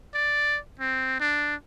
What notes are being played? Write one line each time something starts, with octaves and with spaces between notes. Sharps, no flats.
D5
C4
D4